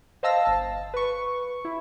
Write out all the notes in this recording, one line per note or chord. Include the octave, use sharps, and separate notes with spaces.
C5 D#5 F5 A5 E6 A#6
G1 A5
B4 C#6
E4